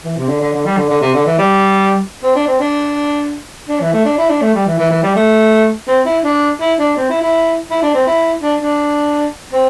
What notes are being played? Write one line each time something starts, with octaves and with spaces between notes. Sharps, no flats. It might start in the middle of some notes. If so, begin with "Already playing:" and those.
E3
C3
D3
D3
D3
G3
D3
D3
C3
D3
E3
G3
C4
D4
C4
D4
D4
E3
A3
D4
E4
D4
A3
G3
E3
E3
E3
G3
A3
C4
E4
D4
E4
D4
C4
E4
E4
E4
D4
C4
E4
D4
D4
C4